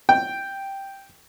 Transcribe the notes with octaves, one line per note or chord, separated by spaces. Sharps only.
G5